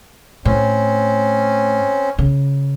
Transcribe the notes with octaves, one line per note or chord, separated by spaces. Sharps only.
A2 C4 C#4
C#3